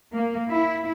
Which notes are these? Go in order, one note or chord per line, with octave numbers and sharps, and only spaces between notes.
A#3
E4